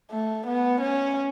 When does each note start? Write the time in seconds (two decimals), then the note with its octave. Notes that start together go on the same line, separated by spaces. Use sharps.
0.11 A3
0.47 B3
0.81 C#4